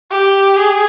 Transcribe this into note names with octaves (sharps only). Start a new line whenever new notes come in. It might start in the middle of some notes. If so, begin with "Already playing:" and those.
G4
G#4